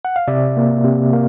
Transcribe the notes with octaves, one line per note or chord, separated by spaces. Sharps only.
F#5
F5
C3 D5 E5
A#3
C3
A#3